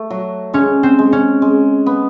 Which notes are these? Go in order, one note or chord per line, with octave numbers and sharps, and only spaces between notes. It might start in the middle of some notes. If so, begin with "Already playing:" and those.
Already playing: A3
F#3
G#3 C#4
C4
G#3
C#4
G#3
B3